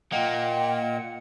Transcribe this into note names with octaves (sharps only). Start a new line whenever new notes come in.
A#2 A#3 D#5 F#5 G5 C#7